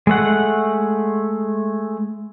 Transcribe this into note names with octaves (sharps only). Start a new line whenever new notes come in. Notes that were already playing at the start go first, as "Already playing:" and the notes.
G#3 A3 F#5